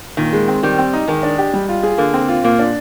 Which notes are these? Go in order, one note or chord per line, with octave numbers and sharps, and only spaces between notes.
A#2 D#3
G#3
C4
D#3 G3
C4
D#4
D#3 G#3
D4
G4
G3
F4
G#4
D3 A#3
C4
F4
A#2 A#3
D4